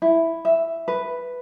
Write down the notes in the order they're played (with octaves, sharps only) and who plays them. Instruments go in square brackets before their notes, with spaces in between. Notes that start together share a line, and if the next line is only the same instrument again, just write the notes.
[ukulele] E4
E5
B4